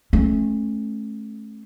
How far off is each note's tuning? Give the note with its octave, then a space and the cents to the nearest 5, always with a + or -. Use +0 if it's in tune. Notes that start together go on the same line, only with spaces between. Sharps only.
A3 -25 C#4 -30